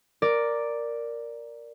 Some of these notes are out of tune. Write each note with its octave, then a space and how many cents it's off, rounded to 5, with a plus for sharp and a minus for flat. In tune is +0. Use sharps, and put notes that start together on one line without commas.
A#4 +0 D5 +0